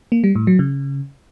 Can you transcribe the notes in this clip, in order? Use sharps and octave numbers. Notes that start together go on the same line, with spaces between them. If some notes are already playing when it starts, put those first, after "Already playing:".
A#3
G3
A2
F#3
C#3